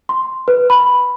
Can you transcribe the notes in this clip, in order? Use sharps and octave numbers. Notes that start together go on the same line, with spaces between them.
C6
B4
B5